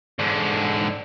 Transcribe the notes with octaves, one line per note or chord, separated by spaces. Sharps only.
G#2 D3